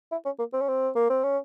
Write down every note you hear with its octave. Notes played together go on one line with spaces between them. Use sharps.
E4
C#4
A#3
C4
C#4
C4
A#3
C4
C#4